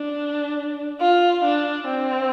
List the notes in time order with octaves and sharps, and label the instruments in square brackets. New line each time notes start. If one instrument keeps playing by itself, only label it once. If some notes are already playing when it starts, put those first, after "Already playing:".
Already playing: [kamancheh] D4
F4
D4
C4